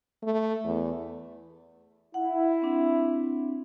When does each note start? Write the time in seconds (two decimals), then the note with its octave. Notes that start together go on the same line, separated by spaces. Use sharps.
0.23 A3
0.64 E2
2.14 E4 F#5
2.62 C4 D4